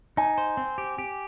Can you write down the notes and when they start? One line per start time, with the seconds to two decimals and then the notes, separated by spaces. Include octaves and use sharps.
0.17 D#4 G#5
0.38 C5
0.57 C4
0.78 G4
0.98 G4